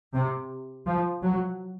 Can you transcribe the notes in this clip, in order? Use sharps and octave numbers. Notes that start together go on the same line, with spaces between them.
C3
F3
F#3